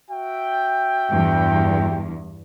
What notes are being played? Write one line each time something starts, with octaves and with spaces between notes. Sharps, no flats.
F#4 E5 G5
E2 G2